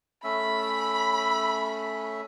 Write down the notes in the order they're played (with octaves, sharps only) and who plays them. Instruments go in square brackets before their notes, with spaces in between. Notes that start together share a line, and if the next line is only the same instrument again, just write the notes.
[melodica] A3 C#4 E5 [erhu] B5